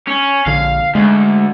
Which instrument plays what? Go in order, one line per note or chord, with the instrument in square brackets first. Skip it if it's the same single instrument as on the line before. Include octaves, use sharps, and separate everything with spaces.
[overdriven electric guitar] C#4
[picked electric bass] A#1 D3 [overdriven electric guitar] F5
[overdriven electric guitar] D2 [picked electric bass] G#3